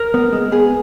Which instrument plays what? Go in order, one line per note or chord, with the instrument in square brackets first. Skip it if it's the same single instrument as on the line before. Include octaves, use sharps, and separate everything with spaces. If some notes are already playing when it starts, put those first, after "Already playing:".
Already playing: [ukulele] A#4
[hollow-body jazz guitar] B3
G#3
[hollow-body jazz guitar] B3 [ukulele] G#4